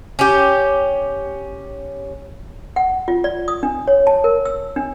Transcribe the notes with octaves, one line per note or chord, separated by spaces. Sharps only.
C#4 G4
F#5
F4
D5
D#6
D4
C#5
A5
A#4
E6
D4